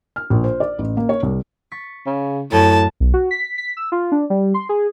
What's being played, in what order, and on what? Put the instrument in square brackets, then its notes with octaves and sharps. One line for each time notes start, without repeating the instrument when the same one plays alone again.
[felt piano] F6
A#1
C5
D5
A1
A#3
C#5
C2
[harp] C#6 A6 B6
[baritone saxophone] C#3
[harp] F#2 [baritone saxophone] A2 [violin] A5
[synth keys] B1
F#4
B6
B6
E6
F4
D4
G3
C6
G#4